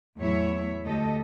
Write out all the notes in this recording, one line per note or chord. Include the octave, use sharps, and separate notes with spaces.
E2 A2 F#3 E4 C#5 E5
D2 A3 G4 A4 D#5